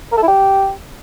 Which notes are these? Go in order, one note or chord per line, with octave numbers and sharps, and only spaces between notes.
A#4
A4
E4
G4